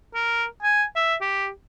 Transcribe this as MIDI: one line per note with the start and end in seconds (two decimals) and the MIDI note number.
0.15 0.45 70
0.62 0.84 80
0.96 1.15 76
1.21 1.49 67